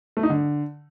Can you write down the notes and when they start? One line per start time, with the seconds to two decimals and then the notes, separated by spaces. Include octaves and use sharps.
0.17 A3
0.23 D#4
0.30 D3